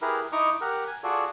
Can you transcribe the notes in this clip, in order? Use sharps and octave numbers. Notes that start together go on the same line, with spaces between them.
E4 G4 G#4 A#4 B4
D#4 E4 D#5 A#5 C#6 D6
G4 A#4 F#5
G#5
F4 F#4 G#4 A4 D5